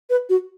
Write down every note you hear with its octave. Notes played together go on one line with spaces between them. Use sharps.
B4
F#4